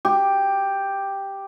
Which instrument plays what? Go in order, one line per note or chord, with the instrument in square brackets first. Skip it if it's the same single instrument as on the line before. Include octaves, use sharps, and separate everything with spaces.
[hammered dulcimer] G4